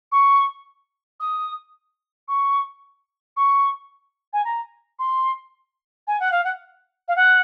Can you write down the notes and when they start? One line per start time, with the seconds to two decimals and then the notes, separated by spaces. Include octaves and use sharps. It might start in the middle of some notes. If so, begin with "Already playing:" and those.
0.12 C#6
1.20 D#6
2.28 C#6
3.36 C#6
4.33 G#5
4.44 A#5
4.99 C6
6.07 G#5
6.19 F#5
6.31 F5
6.44 F#5
7.08 F5
7.16 F#5